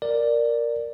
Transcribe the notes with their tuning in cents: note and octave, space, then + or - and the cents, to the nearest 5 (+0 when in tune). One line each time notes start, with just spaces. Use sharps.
A#4 +0 D5 +5